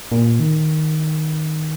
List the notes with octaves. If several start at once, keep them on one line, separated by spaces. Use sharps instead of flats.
A#2
D#3